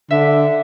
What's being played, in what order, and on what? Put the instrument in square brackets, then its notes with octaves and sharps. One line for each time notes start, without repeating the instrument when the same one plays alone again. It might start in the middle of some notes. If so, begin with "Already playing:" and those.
[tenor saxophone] D3 [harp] E5